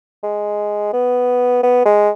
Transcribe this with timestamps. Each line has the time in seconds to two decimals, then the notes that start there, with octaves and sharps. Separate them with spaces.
0.23 G#3
0.93 B3
1.63 B3
1.85 G#3